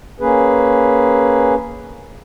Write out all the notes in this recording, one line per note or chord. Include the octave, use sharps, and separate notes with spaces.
A#3 C#4 G#4 B4